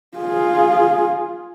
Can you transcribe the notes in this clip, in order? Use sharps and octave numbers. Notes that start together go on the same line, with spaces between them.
F4 G#4